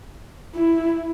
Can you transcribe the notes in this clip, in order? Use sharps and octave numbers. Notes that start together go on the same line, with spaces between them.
E4